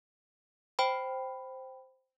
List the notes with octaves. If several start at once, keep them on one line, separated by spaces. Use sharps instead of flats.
C5 G5 B5